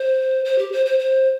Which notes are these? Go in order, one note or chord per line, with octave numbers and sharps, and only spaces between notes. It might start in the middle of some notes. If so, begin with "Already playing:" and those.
Already playing: C5
C5
G4
C5
C5
C5